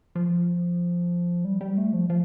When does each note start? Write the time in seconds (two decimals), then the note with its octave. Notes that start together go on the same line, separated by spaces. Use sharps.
0.15 F3
1.45 G3
1.61 G3
1.78 A3
1.93 F3
2.10 F3